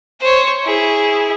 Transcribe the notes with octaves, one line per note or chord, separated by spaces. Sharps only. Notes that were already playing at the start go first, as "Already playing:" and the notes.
C5 C#5
E4 G#4